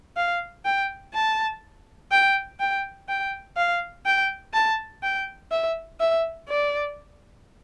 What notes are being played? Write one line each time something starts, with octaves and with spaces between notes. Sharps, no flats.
F5
G5
A5
G5
G5
G5
F5
G5
A5
G5
E5
E5
D5